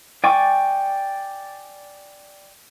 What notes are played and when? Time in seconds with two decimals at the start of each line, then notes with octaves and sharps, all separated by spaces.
0.24 D5 G5 G#5 C#6 D6